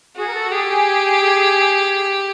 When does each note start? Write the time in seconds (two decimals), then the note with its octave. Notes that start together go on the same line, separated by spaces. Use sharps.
0.16 F#4 G#4
0.28 A#4
0.34 A4
0.51 G4 G#4
0.68 G#4